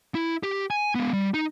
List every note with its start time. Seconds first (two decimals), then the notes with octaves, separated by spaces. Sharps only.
0.15 E4
0.43 G4
0.70 G#5
0.95 G#3 B3
1.13 G3
1.34 D#4